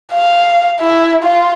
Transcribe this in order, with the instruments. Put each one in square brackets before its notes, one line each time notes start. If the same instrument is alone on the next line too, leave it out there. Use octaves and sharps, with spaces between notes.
[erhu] F5
E4
F4